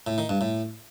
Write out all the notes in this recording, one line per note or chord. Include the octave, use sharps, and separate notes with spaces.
A2
D#3
G2
A2